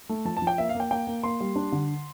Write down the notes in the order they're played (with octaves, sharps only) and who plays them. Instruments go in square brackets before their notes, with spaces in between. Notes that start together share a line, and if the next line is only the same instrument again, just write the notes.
[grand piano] A3
[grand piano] F3 [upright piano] A5
[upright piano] A5
[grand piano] F3
[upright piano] G5
[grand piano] A#3 [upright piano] E5
[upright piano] F5
[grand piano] A#3
[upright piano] G5
[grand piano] A#3 [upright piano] G5
[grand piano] A#3
[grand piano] A#3 [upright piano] C6
[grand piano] G3
D4
D3